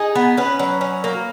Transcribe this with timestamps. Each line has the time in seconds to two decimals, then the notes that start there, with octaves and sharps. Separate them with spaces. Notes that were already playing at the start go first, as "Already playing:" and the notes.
Already playing: D#4 G#4
0.15 B3
0.37 C#4 B4
0.59 F#3
0.81 C#4
1.04 A#3